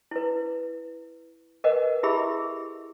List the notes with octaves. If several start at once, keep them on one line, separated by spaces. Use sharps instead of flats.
E4 B4
A#4 B4 D#5 F#5
E4 G4 G#4 E5 B5 E6